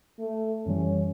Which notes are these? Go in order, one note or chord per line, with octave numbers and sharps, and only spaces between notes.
A3
F#2 E3 G3 C#4